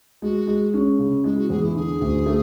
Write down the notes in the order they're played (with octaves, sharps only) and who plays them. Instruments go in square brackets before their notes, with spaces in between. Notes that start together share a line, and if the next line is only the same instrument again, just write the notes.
[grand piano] G#3 [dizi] F#4
[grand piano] G#3
C#4
C#3
[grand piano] G#3 [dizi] E4
[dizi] F#4
[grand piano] E2 [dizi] G#4
[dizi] E4
[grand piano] D3 [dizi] G#4
[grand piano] D2
A3